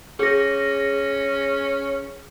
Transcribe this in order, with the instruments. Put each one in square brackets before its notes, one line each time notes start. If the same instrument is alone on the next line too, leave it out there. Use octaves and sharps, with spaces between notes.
[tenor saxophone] C#4 [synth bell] G#4 A#6